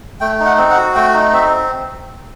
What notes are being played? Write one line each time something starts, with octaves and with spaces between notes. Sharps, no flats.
A3 G5
D#4
F#5
C4
F#5
F#4
A3 G5
D#4
C4 E5